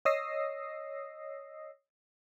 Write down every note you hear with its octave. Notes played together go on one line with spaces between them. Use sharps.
C#5 D#5 D#6 E6 A#6 C7